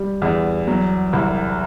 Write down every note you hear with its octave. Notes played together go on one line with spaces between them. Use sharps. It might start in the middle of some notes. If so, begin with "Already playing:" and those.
Already playing: G3
E2
F#3
C2